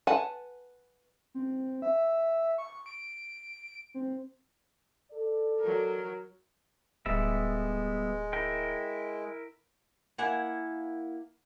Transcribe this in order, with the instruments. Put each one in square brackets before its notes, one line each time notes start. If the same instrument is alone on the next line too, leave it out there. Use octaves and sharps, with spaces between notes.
[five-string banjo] B4 F#5 G#5 A5
[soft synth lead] C4
E5
C#6
D7
C4
[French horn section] A4 D5
[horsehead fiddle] F#3 A#4
[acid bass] D1 [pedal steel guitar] G3 B3 E5 [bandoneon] G#3
[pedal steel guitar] E4 A#4 G5
[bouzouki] A#3 E4 F#5 G#5